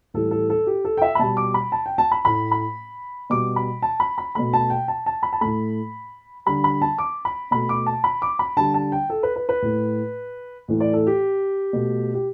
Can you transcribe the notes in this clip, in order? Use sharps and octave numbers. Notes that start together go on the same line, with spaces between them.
A2 E3 G3 A4
A4
A4
G4
A4
G5
E5
B5
B2 G3 A5
D6
B5
A5
G5
A5
B5
A2 A3 B5
B5
B2 G3 D6
B5
A5
B5
B5
B2 A3 B5
A5
G5
A5
A5
B5
A5
A2 A3 B5
D3 G3 B5
B5
A5
D6
B5
B2 A3 B5
D6
A5
B5
D6
B5
D3 G3 A5
A5
G5
A4
B4
B4
B4
A2 A3
A2 E3 A3
D5
A4
G4
B2 A3
G4